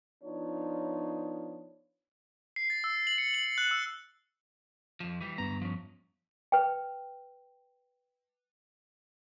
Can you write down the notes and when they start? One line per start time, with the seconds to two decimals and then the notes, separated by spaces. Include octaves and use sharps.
0.24 F3 B3 D4 D#4 F4 C#5
2.56 C7
2.70 A6
2.84 E6
3.07 F#7
3.18 C#7
3.34 F#7
3.58 F#6
3.71 E6
5.00 F2 F3
5.20 E3 G3
5.38 D2 G2 B3 A#5
5.62 F3 C#4
6.52 B4 G5